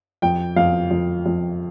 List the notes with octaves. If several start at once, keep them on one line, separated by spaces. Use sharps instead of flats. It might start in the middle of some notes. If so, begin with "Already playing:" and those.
F2 G5
F2 F5
F2
F2